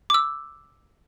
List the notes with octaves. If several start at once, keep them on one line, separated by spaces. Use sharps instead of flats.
D6 E6